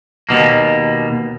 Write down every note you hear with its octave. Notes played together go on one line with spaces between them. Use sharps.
D#2 B2 A#3